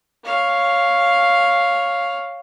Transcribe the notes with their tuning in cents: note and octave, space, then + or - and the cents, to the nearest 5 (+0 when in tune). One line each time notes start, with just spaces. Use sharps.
C#5 +0 F5 +0